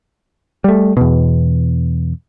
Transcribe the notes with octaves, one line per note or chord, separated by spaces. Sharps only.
G3 A3
E2 B2